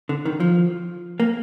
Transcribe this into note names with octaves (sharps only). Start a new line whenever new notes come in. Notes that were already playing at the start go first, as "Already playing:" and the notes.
D3
D#3
F3
A#3